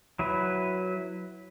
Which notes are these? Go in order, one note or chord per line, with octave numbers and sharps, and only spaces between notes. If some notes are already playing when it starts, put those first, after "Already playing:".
F#3 E4 B4